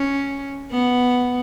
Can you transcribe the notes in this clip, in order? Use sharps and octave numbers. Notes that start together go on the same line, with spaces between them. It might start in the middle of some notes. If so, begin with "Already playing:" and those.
Already playing: C#4
B3